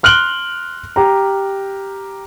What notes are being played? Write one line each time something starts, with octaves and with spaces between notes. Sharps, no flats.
C6 F6 F#6 D7 F#7 G7
G4 A#5